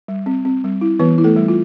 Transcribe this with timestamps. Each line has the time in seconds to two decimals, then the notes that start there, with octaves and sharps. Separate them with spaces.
0.08 G3
0.26 C4
0.45 C4
0.64 G3
0.81 E4
0.99 E3 B3 B4
1.18 E4
1.24 A3 A4
1.36 G3
1.48 F4